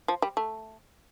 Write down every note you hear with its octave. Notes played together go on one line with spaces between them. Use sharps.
F3
G3
A3